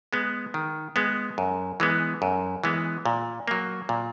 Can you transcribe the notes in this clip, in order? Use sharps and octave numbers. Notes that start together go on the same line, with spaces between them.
G#3 B3
D#3
G#3 B3
F#2
E3 G#3 B3
F#2
E3 G#3 B3
A#2
F#3 A#3
A#2